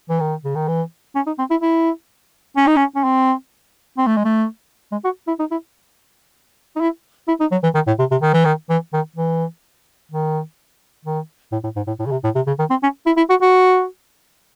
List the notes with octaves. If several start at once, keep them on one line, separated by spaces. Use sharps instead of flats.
E3
D#3
C#3
D#3
E3
C#4
D#4
C4
E4
E4
C#4
D#4
C#4
C#4
C4
C4
A3
G#3
A3
G#3
F#4
E4
D#4
E4
D#4
E4
E4
D#4
F#3
E3
D#3
A2
C3
C3
D#3
E3
D#3
E3
D#3
E3
D#3
D#3
A2
A2
G#2
A2
A2
C#3
C3
A2
C3
C#3
D#3
C4
C#4
E4
E4
F#4
F#4